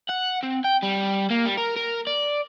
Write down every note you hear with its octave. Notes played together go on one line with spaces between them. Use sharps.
F#5
C4
G5
G3
A#3
G3
A#4
A#4
D5